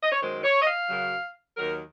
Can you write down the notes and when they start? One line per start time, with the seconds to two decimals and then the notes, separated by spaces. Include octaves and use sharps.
0.02 D#5
0.12 C#5
0.21 F#2 D#3 G#3 C5
0.44 C#5
0.62 D#5
0.67 F5
0.90 F#2 C#3 F#3
1.57 D#2 D#3 F#3 A#4